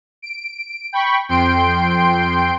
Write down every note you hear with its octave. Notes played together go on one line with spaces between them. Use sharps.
D7
G5 B5 C#6
F2 G5 C6 D7